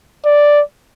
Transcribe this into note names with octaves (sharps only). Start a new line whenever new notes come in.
D5